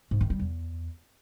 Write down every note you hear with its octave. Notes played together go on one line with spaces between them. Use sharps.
G#2
D#3
G3
E2